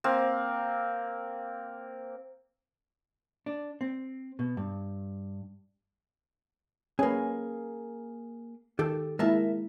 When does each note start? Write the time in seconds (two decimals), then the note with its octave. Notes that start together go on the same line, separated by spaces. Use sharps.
0.04 A#3 C4
3.46 D4
3.81 C4
4.39 B2
4.57 G2
6.99 A#3 C#4 G#4 B4
8.79 D#3 G4 A4
9.19 G#3 A#3 E4 A#4 E5 A5